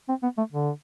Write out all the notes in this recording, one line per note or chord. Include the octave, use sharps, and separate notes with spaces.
C4
B3
A3
D3